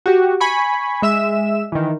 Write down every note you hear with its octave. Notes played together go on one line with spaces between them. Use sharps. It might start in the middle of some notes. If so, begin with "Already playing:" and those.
F#4 G4
G#5 B5 C#6
G#3 E5 E6 E7
D#3 E3